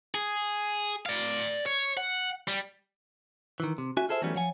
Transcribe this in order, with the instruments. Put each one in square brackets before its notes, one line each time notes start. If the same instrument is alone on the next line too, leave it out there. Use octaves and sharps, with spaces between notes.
[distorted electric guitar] G#4
D5 F5
C#5
F#5
G3
[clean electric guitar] D#3 E3
C3
C#4 F#4 E5 G#5
F4 G#4 A4 C5 E5
E3 F#3 G3 A3 B3 C#4
F3 C#5 F#5 G#5